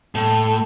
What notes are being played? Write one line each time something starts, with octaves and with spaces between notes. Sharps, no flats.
A2